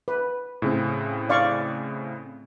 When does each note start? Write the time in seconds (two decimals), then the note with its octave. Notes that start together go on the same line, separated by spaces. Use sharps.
0.08 B4
0.62 A2 C#3 C4
1.29 D5 F5 C#6